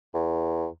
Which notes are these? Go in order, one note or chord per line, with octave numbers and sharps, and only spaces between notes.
E2